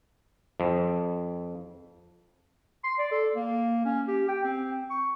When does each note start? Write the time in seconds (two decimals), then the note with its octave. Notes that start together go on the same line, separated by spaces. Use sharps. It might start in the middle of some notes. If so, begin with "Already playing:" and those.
0.60 F2
2.84 C6
2.99 D5
3.12 A4
3.34 A#3
3.85 C#4
4.08 G4
4.28 G5
4.44 C4
4.91 C#6